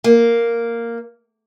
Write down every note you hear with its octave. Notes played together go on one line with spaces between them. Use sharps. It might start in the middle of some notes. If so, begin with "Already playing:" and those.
A#3